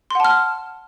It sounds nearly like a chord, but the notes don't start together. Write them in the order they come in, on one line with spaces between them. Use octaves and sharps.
C6 F#5 A5 F6